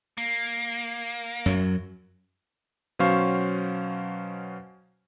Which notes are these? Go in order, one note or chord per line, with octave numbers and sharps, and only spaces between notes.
A#3
F#2 F#3
B2 F#3 C#4 C5 F5 C#6